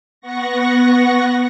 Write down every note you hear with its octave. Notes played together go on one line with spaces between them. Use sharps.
B3 F#5 C#6 A#6